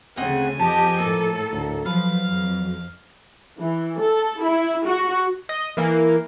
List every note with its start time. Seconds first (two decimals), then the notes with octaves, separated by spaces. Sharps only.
0.17 D2 C#3 A3 C4 D#5 F#5 G#5
0.59 F2 F3 G4 A4 D#5
0.99 A2 A#3 A4
1.52 D2
1.86 F3 F#3 B4 F5
2.26 F2
3.59 E3
3.99 A4
4.41 E4
4.86 F#4
5.49 D#5
5.77 E3 A#3